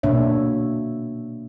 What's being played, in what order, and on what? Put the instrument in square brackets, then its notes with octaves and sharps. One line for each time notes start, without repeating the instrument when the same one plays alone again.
[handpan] B2 A#3 D4 C#5 E5